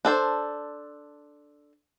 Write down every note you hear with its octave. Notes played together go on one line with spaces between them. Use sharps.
D4 A4 C5